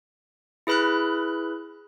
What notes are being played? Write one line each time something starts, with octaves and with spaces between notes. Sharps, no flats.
E4 G#4 B4 B5 F6 F#6